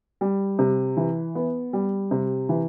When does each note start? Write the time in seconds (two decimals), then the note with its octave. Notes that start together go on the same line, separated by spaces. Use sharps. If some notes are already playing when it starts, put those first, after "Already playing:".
0.21 G3
0.59 C3
0.97 E3
1.35 B3
1.73 G3
2.11 C3
2.49 E3